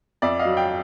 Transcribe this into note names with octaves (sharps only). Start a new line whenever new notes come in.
F2 D5 E5
D#5 F5
F#3
F5 G5